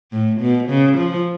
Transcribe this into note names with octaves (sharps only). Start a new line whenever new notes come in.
A2
B2
C#3
F3